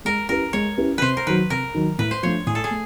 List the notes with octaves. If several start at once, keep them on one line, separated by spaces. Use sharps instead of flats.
G#3 A#4
C#4 E4 G4 A#4 B4
G#3 C#5
C#4 E4 G4 B4
C3 B4 C5
A#4
D#3 F#3 B4
C3 A#4
D#3 F#3
A2 B4
C5
F3 A3 D4 C#5
A2 G#4
A4
G#4
A3